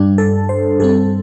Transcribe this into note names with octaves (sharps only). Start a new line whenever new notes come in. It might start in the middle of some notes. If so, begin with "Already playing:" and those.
Already playing: G2 G3 D4
A4
C5
G2 G3 C4 A4